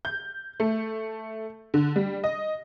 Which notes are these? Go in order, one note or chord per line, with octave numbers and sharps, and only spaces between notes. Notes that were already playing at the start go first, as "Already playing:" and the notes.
G6
A3
D3
G3
D#5